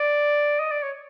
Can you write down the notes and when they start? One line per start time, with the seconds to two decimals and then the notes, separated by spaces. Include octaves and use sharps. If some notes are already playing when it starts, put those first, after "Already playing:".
Already playing: D5
0.60 D#5
0.71 D5
0.83 C#5